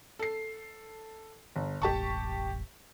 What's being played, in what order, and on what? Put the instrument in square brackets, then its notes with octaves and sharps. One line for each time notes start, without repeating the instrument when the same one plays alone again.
[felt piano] A4 C7
G1
[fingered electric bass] E1 A1 [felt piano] G4 A5 C#6